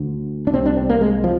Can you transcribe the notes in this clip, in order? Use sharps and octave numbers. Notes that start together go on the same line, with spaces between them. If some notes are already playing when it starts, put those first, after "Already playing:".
Already playing: D2 D3
D4
C2 C3 C4
D4
C4
A#3
G#3
F3